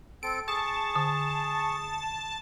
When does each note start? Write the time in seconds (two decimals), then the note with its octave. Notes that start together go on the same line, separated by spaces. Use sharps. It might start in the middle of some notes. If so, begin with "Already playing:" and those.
0.23 C4 A4 D7
0.48 G#4 A5 C#6
0.95 D3